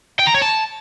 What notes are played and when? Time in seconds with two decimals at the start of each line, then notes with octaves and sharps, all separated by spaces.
0.19 G5
0.27 A#5
0.34 C#5
0.42 A5